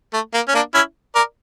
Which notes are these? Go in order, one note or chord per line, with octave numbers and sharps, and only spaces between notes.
A3
A#3
C#4
A#3 D4
C#4 E4
A#4 D5